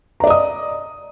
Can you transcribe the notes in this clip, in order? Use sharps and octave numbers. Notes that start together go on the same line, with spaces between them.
D5 D#5 A#5 D#6